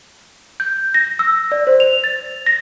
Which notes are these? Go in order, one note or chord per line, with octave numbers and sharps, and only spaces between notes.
G6
A#6
E6
D5
C5
F7
A6
A#6